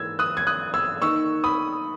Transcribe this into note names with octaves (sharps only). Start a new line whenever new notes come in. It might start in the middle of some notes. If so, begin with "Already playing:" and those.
Already playing: G#2 E3 A#3 E6 G#6
D#6 F#6
G#6
D#6 F#6
E6 G#6
D#3 A#3 D#4 C#6 E6
B5 D#6